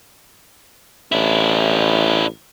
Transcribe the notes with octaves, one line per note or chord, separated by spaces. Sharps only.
A1 D4 E4